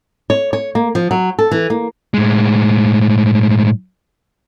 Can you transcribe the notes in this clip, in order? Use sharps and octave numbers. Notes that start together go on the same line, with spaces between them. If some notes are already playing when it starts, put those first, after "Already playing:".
C#5
C#5
A#3
F3
F#3
A4
E3
A#3
A2 G#3